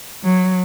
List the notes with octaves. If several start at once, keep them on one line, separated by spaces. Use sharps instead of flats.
F#3